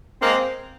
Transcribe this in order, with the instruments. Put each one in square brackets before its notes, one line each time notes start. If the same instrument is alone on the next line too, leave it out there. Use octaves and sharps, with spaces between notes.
[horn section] G#3 A#3 [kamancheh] C4